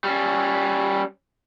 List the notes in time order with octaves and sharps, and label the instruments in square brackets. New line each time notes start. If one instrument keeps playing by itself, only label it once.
[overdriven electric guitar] G3 C#4